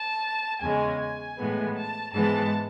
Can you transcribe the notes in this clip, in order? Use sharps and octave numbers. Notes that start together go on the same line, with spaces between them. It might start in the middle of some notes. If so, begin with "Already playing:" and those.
Already playing: A5
E2 C#3 G#3 G#5
G#5
A2 E3 G#3 B3
A5
G#2 E3 G#3 B3 A5